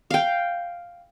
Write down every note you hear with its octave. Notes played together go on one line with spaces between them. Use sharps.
F5 G5